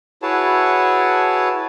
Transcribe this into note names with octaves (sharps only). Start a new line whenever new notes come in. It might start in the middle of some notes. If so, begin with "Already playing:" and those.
E4 F#4 G#4 B4 C#5 A5